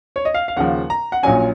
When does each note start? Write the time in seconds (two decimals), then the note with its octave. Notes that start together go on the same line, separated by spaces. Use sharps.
0.16 C#5
0.25 D#5
0.34 F5
0.48 F5
0.57 D#2 C#3 F3 F#5
0.90 A#5
1.12 F#5
1.23 A#1 A#2 F#3 C#4 G#5